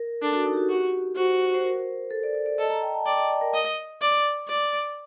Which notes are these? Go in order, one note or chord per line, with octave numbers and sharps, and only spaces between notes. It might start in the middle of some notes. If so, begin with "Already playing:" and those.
Already playing: A#4
D4 A4
F#4
D#4
G4
F#4
F#4 G4
F#4 C5
C5
A#4
A4
D5
D5
D5
A4 D#5
A#5
G5
A5
D5 G5
D#5
D5
A#4
D#5
D5
D5